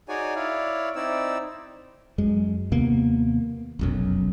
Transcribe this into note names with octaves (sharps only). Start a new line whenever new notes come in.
D#4 F#4 G#4 C#5 D5 G#5
E4 C#5 D5 F5
C4 D#4 E4 D5 E6
F#2 G#3
D#2 C3 A#3 B3
F1 B1 F#2